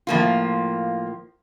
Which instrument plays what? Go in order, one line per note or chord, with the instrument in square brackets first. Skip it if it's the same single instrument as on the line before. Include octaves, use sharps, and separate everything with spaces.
[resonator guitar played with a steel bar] A2 F3 A#3 F4